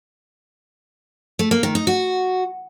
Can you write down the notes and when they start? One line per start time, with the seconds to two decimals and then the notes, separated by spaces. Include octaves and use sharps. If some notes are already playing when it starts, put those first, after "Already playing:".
1.39 A3
1.51 A#3
1.63 D#3
1.75 D#4
1.87 F#4